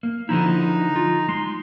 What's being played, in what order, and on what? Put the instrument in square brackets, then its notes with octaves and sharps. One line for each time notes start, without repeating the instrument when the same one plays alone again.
[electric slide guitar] A#3
[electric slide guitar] D3 F3 E4 [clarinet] D#4
[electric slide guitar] F4
[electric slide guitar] G#3 [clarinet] C6